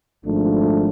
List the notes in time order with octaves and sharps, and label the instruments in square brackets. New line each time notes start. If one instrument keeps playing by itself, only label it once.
[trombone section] G#1 G#2 F3 A3 D4